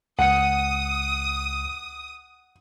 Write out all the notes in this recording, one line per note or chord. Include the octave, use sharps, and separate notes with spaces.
C#2 F#5 D#6 C#7